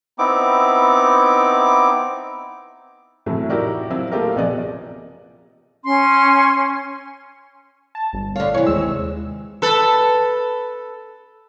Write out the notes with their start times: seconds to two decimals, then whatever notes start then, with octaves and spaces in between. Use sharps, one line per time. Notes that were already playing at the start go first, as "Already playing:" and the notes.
0.19 B3 C4 D#4 E4 D6
3.26 A2 C3 E3 F#3 A3
3.50 D#4 E4 F#4 G4 A#4 D5
3.90 F#3 C4 E4 F4
4.11 A3 A#3 F4 G4 A#4
4.36 A#1 C3 B3 G#4 D5 D#5
5.84 C#4 C6
7.95 A5
8.13 G1
8.36 D3 C#5 F5
8.54 C3 E3 C#5
8.66 D#2 G#3 E6
9.62 A4 B4